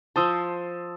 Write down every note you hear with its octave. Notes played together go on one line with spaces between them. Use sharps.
F3 C5 A5 D#6 E6